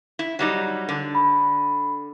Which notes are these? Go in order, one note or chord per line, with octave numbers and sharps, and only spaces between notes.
E4
F#3 G3 D#4
D3
B5